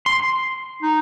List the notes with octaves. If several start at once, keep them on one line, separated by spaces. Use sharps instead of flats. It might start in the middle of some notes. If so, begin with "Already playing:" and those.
C6
D#4